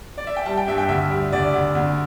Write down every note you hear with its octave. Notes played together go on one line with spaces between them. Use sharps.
D5
E5
G5
G3 A5
G5
G2 E5
G5
D2 E5
G3
D2 D5
D2
D2